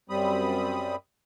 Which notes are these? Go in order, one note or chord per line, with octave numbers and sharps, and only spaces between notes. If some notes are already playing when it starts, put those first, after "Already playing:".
F#2 G3 C4 B5 D#6